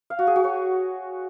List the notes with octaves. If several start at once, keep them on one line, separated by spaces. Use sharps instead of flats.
F5
F#4
G#4
F#4
C#5